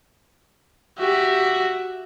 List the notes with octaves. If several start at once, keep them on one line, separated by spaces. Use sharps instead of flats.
F#4 G4 E5